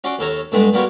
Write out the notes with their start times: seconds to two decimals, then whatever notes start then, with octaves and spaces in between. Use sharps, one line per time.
0.04 C#4 F#4 D5 C6
0.19 D#2 A4 C#5 A#5
0.52 G2 D3 G#3 A3 B3 D#4
0.73 G3 A#3 B3 F#4 C5 C#5